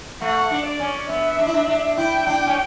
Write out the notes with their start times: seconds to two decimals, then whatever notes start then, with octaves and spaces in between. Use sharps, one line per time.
0.21 A3 F#5
0.51 D4
0.66 D5
0.80 C#4
1.09 B3 E5
1.39 D4
1.47 E4
1.54 D4
1.68 D4
1.97 E4 G5
2.27 D4
2.46 C#4